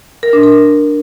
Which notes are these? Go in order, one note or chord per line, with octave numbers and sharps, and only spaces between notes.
A#4
D4
A#4